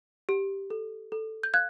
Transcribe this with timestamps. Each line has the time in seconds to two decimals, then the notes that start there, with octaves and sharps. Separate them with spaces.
0.29 G4
0.70 A4
1.12 A4
1.43 G6
1.54 F5 F#6 G#6